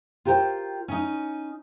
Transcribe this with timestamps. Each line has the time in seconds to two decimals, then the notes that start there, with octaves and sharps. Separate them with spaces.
0.25 F4 G4 A#4 C5 G5
0.88 C#4 D#4